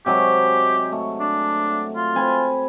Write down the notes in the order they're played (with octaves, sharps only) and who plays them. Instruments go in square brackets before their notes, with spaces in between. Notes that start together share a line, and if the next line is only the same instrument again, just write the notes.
[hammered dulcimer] C3 F#3 G#3 [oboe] G4
[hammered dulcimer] A3
[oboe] D4
F4
[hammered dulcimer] C4 G#5 B5